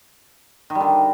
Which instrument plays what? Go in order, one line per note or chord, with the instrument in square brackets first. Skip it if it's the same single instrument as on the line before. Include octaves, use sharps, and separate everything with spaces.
[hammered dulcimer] D#3
G3
D3